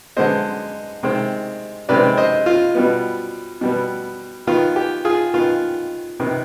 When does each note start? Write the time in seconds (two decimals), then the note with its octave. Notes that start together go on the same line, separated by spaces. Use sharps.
0.17 D3 G#3 B3 C5 D#5
1.03 C3 D#3 G#3 C4
1.89 C3 D#3 G#3 C4 B4 D5
2.17 C5 D#5
2.46 F4
2.75 B2 G3 B3
3.61 B2 G3 B3
4.47 D#3 B3 F4
4.76 G4
5.05 F4 G#4
5.33 D#3 B3 F4
6.20 C3 D#3 B3